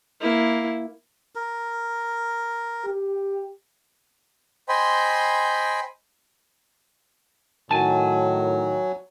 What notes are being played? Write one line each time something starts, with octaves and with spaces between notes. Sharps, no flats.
A#3 E4
A#4
G4
C5 D#5 G5 G#5 B5 C6
A2 D#3 F#3 G#5 A5